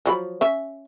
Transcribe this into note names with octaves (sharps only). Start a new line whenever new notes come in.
F3 F#3 B5
C#4 E5